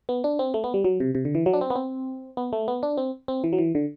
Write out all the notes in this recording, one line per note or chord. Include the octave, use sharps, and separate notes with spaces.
B3
D4
C4
A3
B3
G3
F#3
C3
C3
D3
E3
F#3
D4
C4
B3
C4
B3
A3
B3
D4
C4
C4
E3
F#3
E3
D3